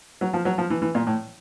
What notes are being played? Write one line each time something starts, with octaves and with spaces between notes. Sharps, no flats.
F#3
F3
F#3
F3
E3
E3
A#2
A2